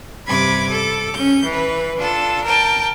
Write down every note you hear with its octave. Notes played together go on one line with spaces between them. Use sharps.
G2 C3 B5 D6 G#6
A4 D6
C#4 G6
E3 B4
D4 F4 A4
A#4 G5 A5